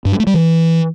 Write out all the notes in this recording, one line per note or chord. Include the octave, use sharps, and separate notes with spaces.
G2
G3
A3
G3
E3